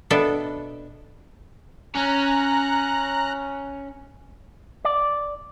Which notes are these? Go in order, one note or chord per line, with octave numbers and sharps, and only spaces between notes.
B2 B3 D4 A4 E5
C#4 A#5 F#6
D5